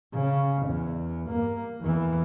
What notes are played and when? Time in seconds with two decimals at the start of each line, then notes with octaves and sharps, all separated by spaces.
0.15 C#3
0.67 E2
1.27 G2 A#3
1.81 E2 E3